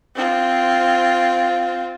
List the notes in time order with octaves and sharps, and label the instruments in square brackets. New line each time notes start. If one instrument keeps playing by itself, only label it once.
[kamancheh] C4 F4